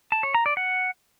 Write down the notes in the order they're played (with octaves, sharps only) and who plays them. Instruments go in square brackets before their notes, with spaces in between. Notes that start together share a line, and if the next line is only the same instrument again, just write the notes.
[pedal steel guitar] A5
C#5
A#5
D5
F#5